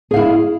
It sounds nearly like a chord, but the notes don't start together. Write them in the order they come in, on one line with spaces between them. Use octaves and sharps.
G#4 F5 E4